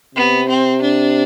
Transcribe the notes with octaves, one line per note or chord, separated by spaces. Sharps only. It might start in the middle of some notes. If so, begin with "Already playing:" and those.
C3 B3
C4
D4